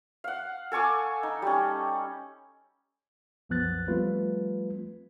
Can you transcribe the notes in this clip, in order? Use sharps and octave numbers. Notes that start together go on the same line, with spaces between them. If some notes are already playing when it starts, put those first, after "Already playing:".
F5 F#5
A4 G#5 C#6 D6
D#4
G3 C#4
C2 F#2 F3 B3 F#6 A6
F3 G3 A3 C4 F4 B4